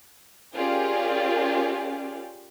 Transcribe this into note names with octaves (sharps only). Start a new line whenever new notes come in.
C#4 F4 G4 G#4 A#4 D5